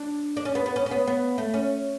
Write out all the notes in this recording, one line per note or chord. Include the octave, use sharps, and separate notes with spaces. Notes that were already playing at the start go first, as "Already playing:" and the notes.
Already playing: D4
D4
C#4
B3
B3
C#4
C#4
B3
B3
A3
C#4